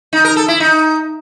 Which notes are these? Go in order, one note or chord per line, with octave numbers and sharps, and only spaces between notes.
D#4
A#4
A4
E4
D#4